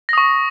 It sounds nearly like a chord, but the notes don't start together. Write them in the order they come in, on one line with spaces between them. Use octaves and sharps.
A#6 D#6 C#6